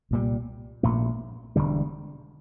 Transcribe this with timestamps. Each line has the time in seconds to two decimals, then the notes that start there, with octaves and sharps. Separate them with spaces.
0.11 C2 A#2 G3
0.83 A#1 A#2 A3
1.56 E1 D2 D3 G3